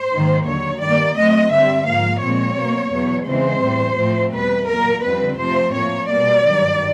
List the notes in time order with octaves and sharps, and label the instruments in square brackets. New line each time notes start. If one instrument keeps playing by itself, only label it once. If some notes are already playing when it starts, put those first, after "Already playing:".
Already playing: [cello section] C5
G#2 D#3 F#3 A#3
D#2 D3 F#3 C#5
G2 D#3 G3 A#3 D5
A2 F#3 A3 C4 D#5
G2 D3 G3 C4 E5
G#2 F3 A#3 F5
A#2 F3 G#3 C4 C#5
B2 F#3 A#3
E2 B2 F#3 B3
E2 C#3 E3 G#3 C4 C5
A2 E3 G3
A2 F3 A3 C4
E2 B2 G3 B4
A#2 F#3 A#3 A#4
F2 D3 G3 C4 B4
F2 C3 F3 A3 C4 C5
A2 F3 A#3 C#5
B2 G3 A#3 D5
G2 D#3 F#3